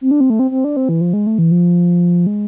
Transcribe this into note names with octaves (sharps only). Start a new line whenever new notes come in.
C4
D4
C4
A3
C4
C4
D4
C4
E3
F3
G#3
A3
E3
F3
G#3